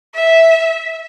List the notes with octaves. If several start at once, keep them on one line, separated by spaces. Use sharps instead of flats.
E5